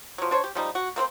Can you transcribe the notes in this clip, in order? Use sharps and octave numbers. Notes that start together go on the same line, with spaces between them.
F3 F#3
D4 C5 C#5
G4
F3 G3 D#4
F#4
A#3 C4 F4 C5